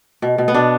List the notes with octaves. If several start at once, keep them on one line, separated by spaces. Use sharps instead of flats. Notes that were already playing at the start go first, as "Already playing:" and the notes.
B2
B2
B3
B2 D4